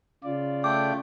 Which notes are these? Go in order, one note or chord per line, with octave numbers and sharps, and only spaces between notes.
C#3 F4 D5
A3 G5 D6